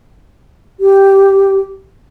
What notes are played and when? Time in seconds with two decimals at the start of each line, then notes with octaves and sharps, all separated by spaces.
0.80 G4